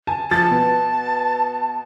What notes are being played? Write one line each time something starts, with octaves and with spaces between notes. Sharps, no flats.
G#5 A5
F3 A5 A6
B2